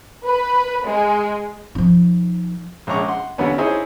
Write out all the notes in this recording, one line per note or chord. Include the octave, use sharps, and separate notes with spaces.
B4
G#3
F3 D#4
A#1 G#3 C#4 A#5 C#6 D6
F#5 C6
D#2 D3 B3 C#4
D#4 E4 G#4 C5 C#5